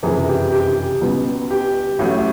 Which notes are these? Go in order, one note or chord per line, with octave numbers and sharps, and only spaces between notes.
F#1 F2 C3 E3 G#4
G4
G4
G4
C#2 B2 G3 B3
G4
A1 A2 F#3